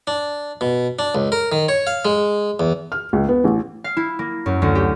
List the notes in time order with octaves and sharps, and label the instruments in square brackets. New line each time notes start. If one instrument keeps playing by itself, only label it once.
[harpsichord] D4
B2
D4
C#2
A#4
D#3
C#5
F5
G#3
E2
[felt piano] F6
C#2
B3
A1
[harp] F5
E4
A#3
F#2
D2
G4